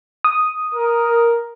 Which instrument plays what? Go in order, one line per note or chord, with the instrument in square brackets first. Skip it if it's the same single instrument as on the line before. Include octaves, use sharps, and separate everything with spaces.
[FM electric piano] D#6
[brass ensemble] A#4